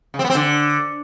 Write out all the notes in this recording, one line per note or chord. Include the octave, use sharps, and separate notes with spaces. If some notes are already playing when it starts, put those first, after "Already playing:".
C#3
C4
B3
C4
D3